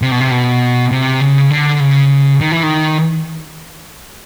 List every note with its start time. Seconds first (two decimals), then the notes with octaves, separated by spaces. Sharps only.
0.02 C3
0.12 B2
0.21 C3
0.31 B2
0.92 C3
1.21 C#3
1.50 D3
1.80 C#3
2.41 D#3
2.52 E3
2.63 D#3